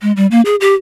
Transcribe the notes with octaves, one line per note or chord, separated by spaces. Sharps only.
G#3
G3
A#3
G#4
G4